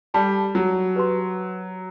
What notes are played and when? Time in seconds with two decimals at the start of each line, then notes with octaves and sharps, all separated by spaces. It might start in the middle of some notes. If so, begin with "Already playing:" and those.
0.14 G3 A4 D5 A5
0.55 F#3
0.96 G4 B4 F#5 C6